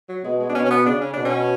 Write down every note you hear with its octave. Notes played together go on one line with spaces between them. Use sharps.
F#3
B2 G#3
G#3
D4
B2 C#4
C#4
B3
C#3 D4
C#4
B2 D4
C#4